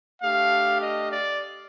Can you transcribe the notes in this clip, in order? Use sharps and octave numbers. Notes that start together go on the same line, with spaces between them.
A3 D4 G4 F5
D#5
D5